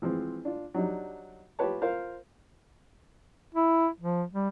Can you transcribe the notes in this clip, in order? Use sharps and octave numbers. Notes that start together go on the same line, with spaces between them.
E3 F3 G#3 C4
D4 F4
F#3 G3 D4 D#4
F4 G4 B4 C#5 A5
F4 A#4 C5 F5
E4
F3
G3